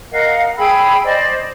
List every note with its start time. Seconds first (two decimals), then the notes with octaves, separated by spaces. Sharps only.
0.12 A#4 D#5 F5 F#5
0.57 G#4 G5 B5 E6
1.03 C5 D5 D#5